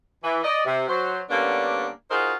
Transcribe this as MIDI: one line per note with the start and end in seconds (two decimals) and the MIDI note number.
0.24 0.41 52
0.43 0.62 74
0.43 0.62 75
0.66 0.87 48
0.88 1.19 54
0.88 1.19 72
1.30 1.88 50
1.30 1.88 55
1.30 1.88 58
1.30 1.88 59
1.30 1.88 61
1.30 1.88 62
2.11 2.33 63
2.11 2.33 65
2.11 2.33 66
2.11 2.33 68
2.11 2.33 70
2.11 2.33 72